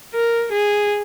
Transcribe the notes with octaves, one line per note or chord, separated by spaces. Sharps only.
A#4
G#4